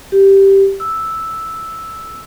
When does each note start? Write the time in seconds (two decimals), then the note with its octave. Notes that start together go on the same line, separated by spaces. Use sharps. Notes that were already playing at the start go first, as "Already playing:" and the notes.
0.12 G4
0.80 E6